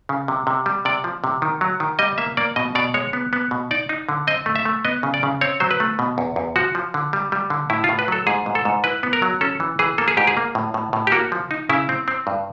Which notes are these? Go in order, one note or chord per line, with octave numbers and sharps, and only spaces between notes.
C#3
C3
C3
G3
C3 D5
F3
C3
D#3
F#3
D#3
G3 D#5
A#3 E5
A#3 D5
B2 D#5
B2 D5
G#3 C#5
B3
B3
B2
D#4 D5
D#4
D3
C4 D#5
A3
E5
A3
B3 D#5
C#3
D5
C#3
C4 C#5
F#3 C5
B4
A3
B2
E2
E2
F3 F#4
F3
D3
G3
G3
D3
A2 E4
F4
A2
B4
F#3 A4
G#2 G#4
G#2
A4
G#2
E4 B4
B3
A#4
F#3
C#4 A4
E3
E3 G#4
A#3 A4
G#4
G#2 G4
G#4
A#3
A2
A2
A2
G4
A#3 F#4
F3
D#4
C#3 E4
C4
C4
G2